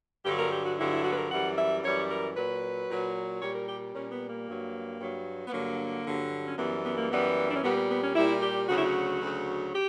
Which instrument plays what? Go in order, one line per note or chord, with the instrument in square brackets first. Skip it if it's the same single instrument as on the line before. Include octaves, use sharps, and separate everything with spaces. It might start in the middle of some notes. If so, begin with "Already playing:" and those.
[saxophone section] G2 D3 F#3 G4
A#4
G4
F#4
G2 D3 F#3 E4
E4
F#4
B4
A#4
F#2 E3 G3 F#5
E5
F#2 E3 G3 C#5
A#4
A#2 F#3 B4
A#2 F#3
A#2 G3 C#5
A#4
G4
A#2 G3 C#4
B3
A#3
G2 F#3
G2 F#3
B3
G2 D3 F#3 A#3
G2 D3 F#3
C#4
F#2 E3 G3 B3
B3
A#3
F#2 E3 G3 B3
D4
C#4
A#2 G3 B3
B3
B3
C#4
A#2 G3 E4
G4
D2 C#3 F#3 F#4
E4
F#4
D2 C#3 F#3
G4